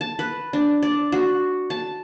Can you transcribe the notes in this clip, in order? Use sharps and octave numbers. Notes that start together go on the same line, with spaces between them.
A5
B4
D4
D5
F#4
A5